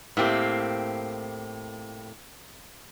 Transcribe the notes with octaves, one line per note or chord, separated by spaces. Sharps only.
A2 A#3 C4 G4